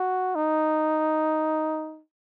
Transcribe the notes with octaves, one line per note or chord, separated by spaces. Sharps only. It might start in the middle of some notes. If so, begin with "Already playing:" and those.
Already playing: F#4
D#4